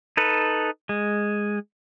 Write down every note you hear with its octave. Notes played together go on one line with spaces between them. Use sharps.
D#4 A4 B4
G#3